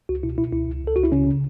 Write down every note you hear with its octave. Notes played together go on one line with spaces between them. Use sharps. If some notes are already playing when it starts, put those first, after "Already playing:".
C#2 F#4
B2 E4
B2 E4
C#2 E4
C#2
C#2 A4
C#2 F#4
E4
C#3 C#4
C#3